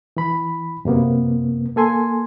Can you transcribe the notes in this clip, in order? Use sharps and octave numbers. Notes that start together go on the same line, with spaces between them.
E3 B5
F#2 C3 A#3 B3
A#3 A4 G#5 C6